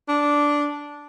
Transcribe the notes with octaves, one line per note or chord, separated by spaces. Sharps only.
D4